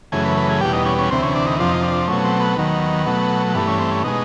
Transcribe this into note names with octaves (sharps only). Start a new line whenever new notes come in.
F#2 C#3 E3 A3 G#4
B4
B4
G#4
E2 B2 G3 G4
D#4
C#4
C#4
D2 C3 E3 C4
C#4
D4
D#4
F2 C3 F3 D4
D#4
D4
B2 F#3 A3 C#4
C4
B3
D#2 D#3 F#3
B2 F#3 A3
G2 E3 A3 B3
C#4
C4
C#4
B2 G#3 D#4